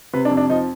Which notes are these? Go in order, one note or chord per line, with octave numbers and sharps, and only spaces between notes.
C3 B4
D4
F2
D4
F3 D#4